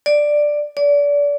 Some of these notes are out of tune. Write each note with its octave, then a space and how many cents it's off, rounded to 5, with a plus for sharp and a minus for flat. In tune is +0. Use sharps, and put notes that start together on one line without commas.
D5 +5
D5 -30